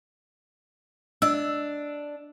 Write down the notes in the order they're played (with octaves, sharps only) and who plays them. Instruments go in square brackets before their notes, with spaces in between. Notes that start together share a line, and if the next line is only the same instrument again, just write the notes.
[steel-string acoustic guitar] D4 [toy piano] D#5 E6